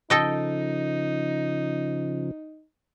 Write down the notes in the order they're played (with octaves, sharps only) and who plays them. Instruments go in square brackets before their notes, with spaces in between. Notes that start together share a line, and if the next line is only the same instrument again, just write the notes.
[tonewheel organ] C#3 F3 [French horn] D#4 [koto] A4 D#5 G5